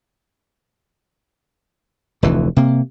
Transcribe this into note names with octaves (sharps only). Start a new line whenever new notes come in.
F1 D2 E3
C3 A#3